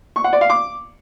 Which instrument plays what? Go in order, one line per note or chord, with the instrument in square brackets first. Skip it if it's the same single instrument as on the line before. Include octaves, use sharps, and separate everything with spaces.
[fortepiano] C#6
F#5
D5
F5
D6